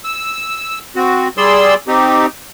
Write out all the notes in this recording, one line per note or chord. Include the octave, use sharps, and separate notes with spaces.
E6
C4 F#4
G3 G#4 D5 C6 E6
C4 D#4 G4